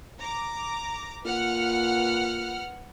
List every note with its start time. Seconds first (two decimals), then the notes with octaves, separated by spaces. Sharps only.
0.21 A#5 D6
1.25 A#2 B4 F#5 F6